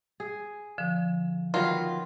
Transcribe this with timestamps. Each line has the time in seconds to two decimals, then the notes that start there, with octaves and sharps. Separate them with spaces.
0.20 G#4
0.78 D3 F3
1.54 D#3 F#3 B3 F4